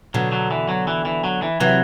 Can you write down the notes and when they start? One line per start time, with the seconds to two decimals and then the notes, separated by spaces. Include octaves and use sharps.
0.14 B2 D3 F#3
0.32 F#3
0.51 E3
0.69 F#3
0.87 E3
1.05 E3
1.24 F#3
1.42 E3
1.60 C3 E3 F#3